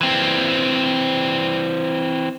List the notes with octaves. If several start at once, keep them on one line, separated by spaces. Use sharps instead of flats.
E3 C4